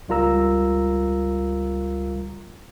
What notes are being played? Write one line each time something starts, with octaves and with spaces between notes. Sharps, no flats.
C#2 G3 F4 A#4 A#5 E6